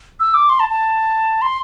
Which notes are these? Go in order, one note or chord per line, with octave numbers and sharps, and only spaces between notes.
E6
D6
C6
A5
A5
C6